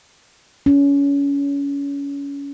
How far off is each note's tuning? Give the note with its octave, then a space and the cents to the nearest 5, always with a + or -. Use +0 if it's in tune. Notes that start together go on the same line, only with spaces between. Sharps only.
C#4 +25